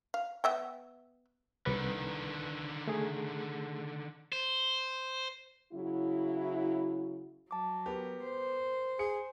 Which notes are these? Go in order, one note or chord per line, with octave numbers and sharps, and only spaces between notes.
F5
B3 E5 G5
C2 D3 D#3 B4
A3 G#4
C5
C#3 F#3 E4
F#3 A5 D6
B3 G4 A#4
C5
G#4 C#7